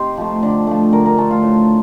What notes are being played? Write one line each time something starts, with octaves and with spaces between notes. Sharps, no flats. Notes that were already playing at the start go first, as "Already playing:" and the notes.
Already playing: C3 D#4 G4 C5
F3 A3
D3
F3 A3
D3 A#4
A#4
A3 A4
F4
A2